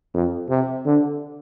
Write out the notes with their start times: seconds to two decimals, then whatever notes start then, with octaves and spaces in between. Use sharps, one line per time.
0.14 F2
0.49 C3
0.86 D3